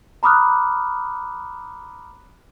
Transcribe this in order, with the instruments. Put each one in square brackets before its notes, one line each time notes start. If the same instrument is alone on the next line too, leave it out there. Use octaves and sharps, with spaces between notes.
[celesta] A#5 B5 D6 D#6 F6 F#6